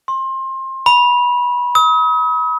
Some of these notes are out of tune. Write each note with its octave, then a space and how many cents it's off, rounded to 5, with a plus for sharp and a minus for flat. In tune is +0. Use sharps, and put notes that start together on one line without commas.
C6 +25
B5 -20
D#6 +40